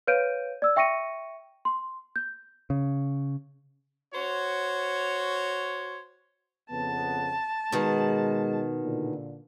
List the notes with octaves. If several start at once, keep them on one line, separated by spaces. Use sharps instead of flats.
B4 C#5 F5 G6 D7 D#7
D5 E6
E5 G5 C#6 A#6 C#7 D#7
C6
G6
C#3
F#4 C5 C#5
F2 C#3 B3 A5
B2 D#3 G#3
A#2 D3